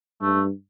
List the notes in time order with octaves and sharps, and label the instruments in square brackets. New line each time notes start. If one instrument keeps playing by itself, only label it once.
[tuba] G2 [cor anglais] A3